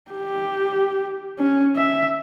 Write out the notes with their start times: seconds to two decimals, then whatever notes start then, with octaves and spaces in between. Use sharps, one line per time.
0.11 G4
1.39 C#4
1.76 E5